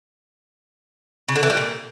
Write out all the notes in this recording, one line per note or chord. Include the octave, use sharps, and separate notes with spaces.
C#3
D3
E3
G3
A#2